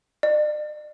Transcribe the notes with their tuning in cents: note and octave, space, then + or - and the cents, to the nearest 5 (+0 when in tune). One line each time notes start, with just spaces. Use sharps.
D5 +45